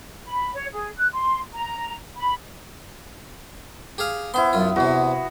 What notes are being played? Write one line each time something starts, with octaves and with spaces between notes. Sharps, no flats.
B5
C#5
G#4
F#6
C6
A#5
B5
G4 G#4 F5
B3 E4 C5 C6
F#2 F4
E2 C3 F#4